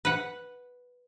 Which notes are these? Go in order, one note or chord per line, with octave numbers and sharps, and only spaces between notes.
B4 F#5